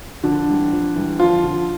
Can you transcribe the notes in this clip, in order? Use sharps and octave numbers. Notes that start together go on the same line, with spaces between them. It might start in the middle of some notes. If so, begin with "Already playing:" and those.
F2 D3 D4
E3 G3
F2
E3 G3
F2 F3 F4
D3 F3